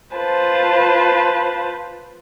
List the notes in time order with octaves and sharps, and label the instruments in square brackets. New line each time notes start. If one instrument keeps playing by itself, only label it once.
[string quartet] F4 B4 C5 A5